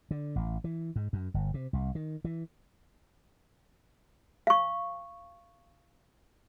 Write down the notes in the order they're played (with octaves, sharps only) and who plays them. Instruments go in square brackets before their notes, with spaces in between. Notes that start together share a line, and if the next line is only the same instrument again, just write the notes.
[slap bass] D3
A1
E3
G#2
F#2
G1
C3
C2
D#3
E3
[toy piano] F5 C#6